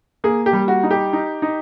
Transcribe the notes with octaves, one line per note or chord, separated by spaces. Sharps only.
A#3 G#4
G4
G3
F#4
D#4
G4
D#4
D#4